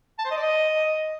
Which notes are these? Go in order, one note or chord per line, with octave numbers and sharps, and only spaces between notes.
A5
C5
D#5
D5
D#5